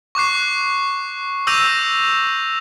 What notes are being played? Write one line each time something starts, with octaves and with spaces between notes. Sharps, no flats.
C#6 D6 F#6 C7
D6 E6 G6 A#6 D#7 F7